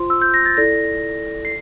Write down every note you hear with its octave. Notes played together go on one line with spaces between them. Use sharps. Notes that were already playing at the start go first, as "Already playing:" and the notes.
Already playing: F4 C5 C6
E6
G6
A#6
A6
E4 A4 D5 A#6
C7